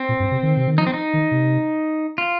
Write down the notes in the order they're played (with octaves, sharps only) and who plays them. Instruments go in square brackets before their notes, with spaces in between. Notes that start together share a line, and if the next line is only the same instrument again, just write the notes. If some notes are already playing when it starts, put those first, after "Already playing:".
Already playing: [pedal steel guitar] C4
[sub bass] A#2
G2
C3
D#3
C3
D#3
[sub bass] F3 [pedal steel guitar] D#4
[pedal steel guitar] C4
D#4
[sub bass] D#3
C3
[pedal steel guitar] F4